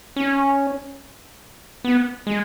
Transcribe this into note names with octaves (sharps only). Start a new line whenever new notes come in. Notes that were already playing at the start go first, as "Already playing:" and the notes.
C#4
B3
G#3